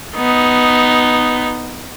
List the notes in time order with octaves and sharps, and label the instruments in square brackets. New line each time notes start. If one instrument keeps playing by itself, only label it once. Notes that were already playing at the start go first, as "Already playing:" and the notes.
[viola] B3 D#4